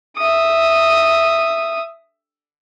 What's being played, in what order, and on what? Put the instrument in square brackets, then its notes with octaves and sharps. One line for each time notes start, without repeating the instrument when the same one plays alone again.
[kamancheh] E5 D#6